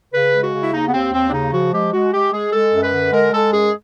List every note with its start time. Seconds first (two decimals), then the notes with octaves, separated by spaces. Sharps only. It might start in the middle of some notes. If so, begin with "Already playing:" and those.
0.13 C#3 B4
0.33 G#3
0.44 F#4
0.53 C#3
0.62 E4
0.73 D#2 D#4
0.87 B3
0.93 D#2 C4
1.13 D#2 C4
1.29 D4
1.33 C#3 D#4
1.53 F3 F#4
1.73 G#3 G4
1.93 G#3 F#4
2.13 G#3 G4
2.33 G#3 G#4
2.53 G#3 A4
2.74 F#2
2.83 B4
2.94 D3
3.13 G#3 A#4
3.33 G#3 A4
3.53 F#2 G#4